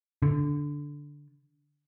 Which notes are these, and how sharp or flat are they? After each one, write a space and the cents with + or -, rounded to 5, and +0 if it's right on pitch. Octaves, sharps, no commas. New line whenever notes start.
D3 -10